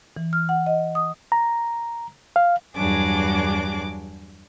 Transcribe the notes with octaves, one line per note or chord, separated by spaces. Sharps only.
E3
F6
F#5
D#5
D#6
A#5
F5
E2 G2 F#3 D4 G#4 D6